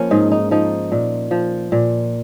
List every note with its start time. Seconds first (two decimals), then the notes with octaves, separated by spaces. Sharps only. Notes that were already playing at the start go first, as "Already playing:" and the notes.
Already playing: F3 A#3 C#4
0.11 G#2 D#4
0.31 D#4
0.51 F3 D#4
0.92 A#2
1.31 F3
1.72 A#2